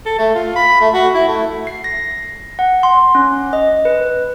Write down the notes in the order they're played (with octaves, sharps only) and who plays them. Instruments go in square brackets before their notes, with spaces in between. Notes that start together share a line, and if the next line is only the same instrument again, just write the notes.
[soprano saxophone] A4
A3
F4
B5
A3
F#4
E4
A3
[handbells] C7
A#6
F#5
C6
C#4
D#5
B4